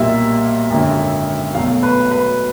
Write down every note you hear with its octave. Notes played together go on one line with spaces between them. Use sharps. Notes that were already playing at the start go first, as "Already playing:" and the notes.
Already playing: B1 A#2 G3 A#3 E5
G#1 F#2 D3
B1 B2 F#3 A3 F5
B4
B4